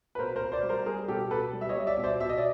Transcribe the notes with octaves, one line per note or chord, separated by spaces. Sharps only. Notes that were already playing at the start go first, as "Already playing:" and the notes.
B4
B2 A#4 C5
A#4 C5
B2
C5 D5
G3
A#4 C5
G3 G#4 A#4
B2 G4 A4
B2 A4 B4
G3
E5
C#5 D#5
G3
D5 E5
B2
C5 D5
B2 E5
D#5
D5